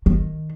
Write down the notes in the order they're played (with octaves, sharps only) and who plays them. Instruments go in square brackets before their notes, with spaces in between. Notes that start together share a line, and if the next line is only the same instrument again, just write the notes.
[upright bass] D#3